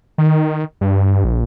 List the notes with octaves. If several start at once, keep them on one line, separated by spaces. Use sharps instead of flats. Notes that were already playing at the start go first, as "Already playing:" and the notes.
D#3
G2
A#1